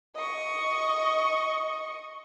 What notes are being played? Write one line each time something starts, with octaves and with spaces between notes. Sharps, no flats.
D#5 C#6